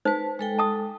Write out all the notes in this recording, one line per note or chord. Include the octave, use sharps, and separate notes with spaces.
D#4 B4 C5 A5
G#3 A4 G5
A5 D#6